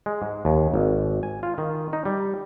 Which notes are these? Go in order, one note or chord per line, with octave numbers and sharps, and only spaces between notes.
G#3
G#2
D#2
G#1
G#5
F4
D#3
D#4
G3